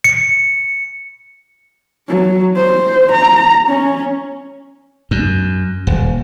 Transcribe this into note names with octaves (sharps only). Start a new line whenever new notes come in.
C#7
F#3
C5
A#5
C#4
F#2
D#1